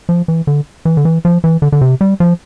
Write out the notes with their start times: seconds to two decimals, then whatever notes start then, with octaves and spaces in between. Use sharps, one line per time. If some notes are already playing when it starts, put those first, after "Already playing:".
0.09 F3
0.28 E3
0.47 D3
0.85 E3
0.97 D3
1.05 E3
1.25 F3
1.44 E3
1.62 D3
1.72 D3
1.81 C3
2.01 G3
2.20 F3